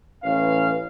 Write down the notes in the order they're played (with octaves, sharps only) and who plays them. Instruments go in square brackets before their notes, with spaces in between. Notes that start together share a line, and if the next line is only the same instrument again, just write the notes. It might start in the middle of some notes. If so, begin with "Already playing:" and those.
[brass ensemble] A1 C#4 B4 F5